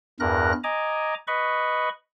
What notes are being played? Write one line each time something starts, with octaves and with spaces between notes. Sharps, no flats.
E2 G2 A#4 F#6 A#6
D#5 G#5 A#5 D6
B4 D#5 B5 C#6